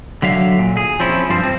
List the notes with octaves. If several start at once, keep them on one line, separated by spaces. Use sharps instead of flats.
D3 F#3 E5 F5
A#2
G#4
F3 C4 C#4 E4
G2 F3 G3 C5
C4